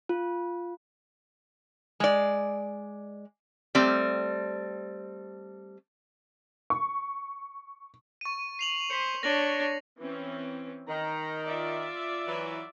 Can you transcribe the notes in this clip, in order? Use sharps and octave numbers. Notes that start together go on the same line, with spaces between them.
F4
G#3 D5
G3 A3 C4 D5
C#6
C#6 D#7
C7 F7 F#7
C5 B6 C#7
D4 C#5 A#6 F#7
E3 C4 C#4
D#3 A#5
F4 D5 E5
E3 F#3